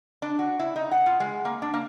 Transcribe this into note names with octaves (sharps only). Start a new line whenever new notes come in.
D4
F#4
E4
D#4
F#5
F4
G#3
A#3
D4
A#3